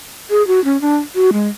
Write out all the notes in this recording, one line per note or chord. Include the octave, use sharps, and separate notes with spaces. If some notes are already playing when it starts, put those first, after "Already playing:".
G#4
F#4
C#4
D4
F#4
G#3